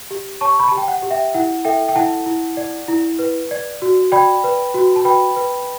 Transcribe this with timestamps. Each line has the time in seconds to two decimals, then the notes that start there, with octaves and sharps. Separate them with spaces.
0.11 G4
0.41 C#5 A5 C#6
0.59 B5
0.68 G4 A5
0.77 G5
0.88 F#5
1.02 G4
1.11 E5 G5
1.34 E4 F#5
1.65 A4 E5 G5
1.89 G5
1.96 E4 F#5 A5
2.26 E4
2.57 D5
2.88 E4
3.19 B4
3.51 D5
3.82 F#4
4.12 D5 G5 B5
4.44 B4
4.74 F#4
4.96 A5
5.05 B4 G5 B5
5.36 B4